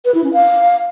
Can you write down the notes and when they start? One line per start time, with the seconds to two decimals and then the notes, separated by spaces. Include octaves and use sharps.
0.05 B4
0.14 E4
0.24 C#4
0.33 F5